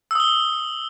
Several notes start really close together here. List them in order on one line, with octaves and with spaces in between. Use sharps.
E6 D#6 G7